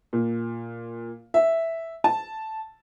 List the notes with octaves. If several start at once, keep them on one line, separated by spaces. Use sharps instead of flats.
A#2
E5
A5